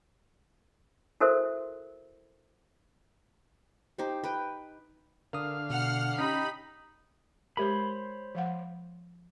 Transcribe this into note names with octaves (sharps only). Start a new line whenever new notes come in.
E4 F#4 A4 A#4 C5 E5
D#4 G4 C5
B4 G5
D3 A#4 F5 D#6
B2 F#5 F6 C7
C#4 D#4 G4 B5
G#3 G4 A#4 C5 C#5 B5
F3 F5 F#5